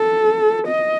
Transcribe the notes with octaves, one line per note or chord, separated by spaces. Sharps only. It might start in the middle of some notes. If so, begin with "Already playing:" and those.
Already playing: A4
D#5